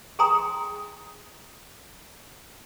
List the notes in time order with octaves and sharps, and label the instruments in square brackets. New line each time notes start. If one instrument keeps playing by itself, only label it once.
[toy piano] G#4 G5 G#5 A#5 C6 D#6